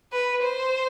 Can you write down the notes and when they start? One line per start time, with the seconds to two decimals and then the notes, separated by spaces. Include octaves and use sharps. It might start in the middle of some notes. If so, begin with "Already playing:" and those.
0.13 B4
0.43 C5